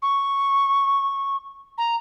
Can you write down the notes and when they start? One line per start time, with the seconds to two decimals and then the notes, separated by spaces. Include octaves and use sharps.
0.02 C#6
1.78 A#5